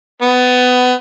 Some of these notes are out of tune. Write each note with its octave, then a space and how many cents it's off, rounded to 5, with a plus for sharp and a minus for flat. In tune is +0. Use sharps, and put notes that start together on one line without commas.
B3 +20